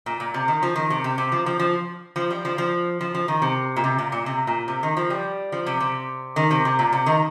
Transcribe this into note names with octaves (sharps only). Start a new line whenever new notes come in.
A#2
A#2
C3
D#3
F3
D#3
C3
C3
C3
F3
F3
F3
F3
G3
F3
F3
F3
F3
D#3
C3
A#2
C3
A#2
A#2
C3
A#2
C3
D#3
F3
G3
F3
C3
C3
D#3
C3
C3
A#2
C3
D#3